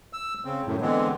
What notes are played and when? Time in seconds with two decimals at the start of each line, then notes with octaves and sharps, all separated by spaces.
0.13 E6
0.45 C#3 C4
0.66 F#2 A2
0.81 D3 E3 G#3 B3 C4